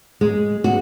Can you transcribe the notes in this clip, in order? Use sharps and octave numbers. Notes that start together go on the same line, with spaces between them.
G#3
F#4